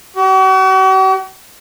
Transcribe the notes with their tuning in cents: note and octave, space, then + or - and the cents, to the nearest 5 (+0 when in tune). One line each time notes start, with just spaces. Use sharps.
F#4 +45